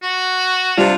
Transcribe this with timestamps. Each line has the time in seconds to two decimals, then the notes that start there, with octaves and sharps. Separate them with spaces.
0.03 F#4
0.78 C3 G3 D4 F4